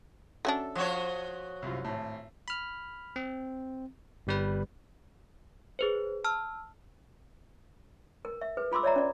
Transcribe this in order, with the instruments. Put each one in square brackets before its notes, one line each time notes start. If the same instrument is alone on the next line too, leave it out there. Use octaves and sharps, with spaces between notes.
[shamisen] F#3 C#4 D4 [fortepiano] A4 E5
[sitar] F3 F#4 C#5
[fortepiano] C2 F#2 F4
G#1 A2
[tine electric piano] B5 F6
C4
G1 G3 B4
[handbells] G#4 B4 C5
A5 E6 F6
[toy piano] A#4
E5
G#4 B4
F4 B5 C6 D6 E6
C#5 D5 E5 A#5
C#4 D5